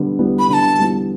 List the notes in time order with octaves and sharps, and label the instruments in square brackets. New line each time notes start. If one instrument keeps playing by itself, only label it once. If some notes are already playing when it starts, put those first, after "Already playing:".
Already playing: [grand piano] D3 G3 B3
G3 B3 E4
[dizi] B5
[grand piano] D3 [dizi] B5
[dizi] A5
[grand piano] G3 B3 E4